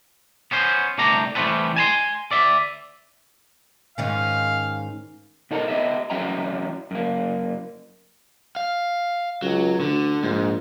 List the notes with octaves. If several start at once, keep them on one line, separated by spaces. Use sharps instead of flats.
B3 C#4 C5
C2 A3 D4 G4 A#5
E3 G3 A3 C4 A4 B4
G#5 A5 C6
D5 E5
G#2 D#3 C#4 F5
B2 D#4 A4 A#4
B3 G4 D#5 E5
E3 F#3 C#4 E5 G5 A#5
F#2 A#3
F5
C#2 F#3
D2 D3
A#1 G#2